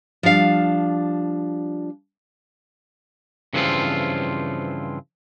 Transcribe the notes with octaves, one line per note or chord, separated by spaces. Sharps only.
F3 G3 D4 F5
G2 C#3 E3 F3 C4 F4